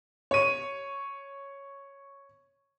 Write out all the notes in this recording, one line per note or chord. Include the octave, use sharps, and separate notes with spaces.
C#5 D#7